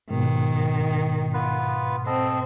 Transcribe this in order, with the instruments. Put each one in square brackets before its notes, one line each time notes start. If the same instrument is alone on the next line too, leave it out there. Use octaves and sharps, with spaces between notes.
[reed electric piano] G#2 B2 [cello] D#3
[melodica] B3 F4 B4
[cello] C4 [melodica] A4 D#5